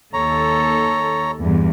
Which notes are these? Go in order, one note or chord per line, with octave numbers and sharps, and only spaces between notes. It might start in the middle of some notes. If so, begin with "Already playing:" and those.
D#2 A4 C#5 A#5
E2 G2